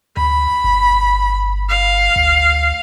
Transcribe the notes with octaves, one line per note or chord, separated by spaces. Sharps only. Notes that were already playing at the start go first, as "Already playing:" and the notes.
D2 B5
G1
F5
D2